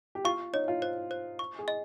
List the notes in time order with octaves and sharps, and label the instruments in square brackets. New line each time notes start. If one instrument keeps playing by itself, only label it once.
[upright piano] G4
[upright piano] F4 [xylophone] C#6
[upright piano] D#4 [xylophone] C#5
[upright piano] F4
[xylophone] C5
C5
C#6
[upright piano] G#4
[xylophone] D#5